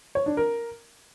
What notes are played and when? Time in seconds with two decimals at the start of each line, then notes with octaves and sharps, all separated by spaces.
0.15 C#5
0.26 D4
0.37 A#4